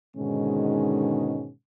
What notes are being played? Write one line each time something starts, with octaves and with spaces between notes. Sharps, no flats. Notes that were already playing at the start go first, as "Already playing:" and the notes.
G#2 B2 D3 D#3 G#3 C#4